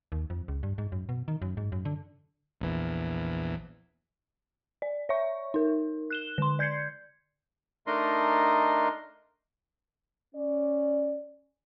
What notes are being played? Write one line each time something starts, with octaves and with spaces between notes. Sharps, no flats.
D#2
F2
C#2
G2
G#2
F#2
B2
D#3
F#2
G#2
F#2
D3
A#1 E2 E3
D5
C#5 E5 C#6
D#4 A#4
F#6 E7 G7
D3 C6
D5 G6 G#6 C7 C#7
A3 D4 D#4 A#4 D#5 C6
C#4 D5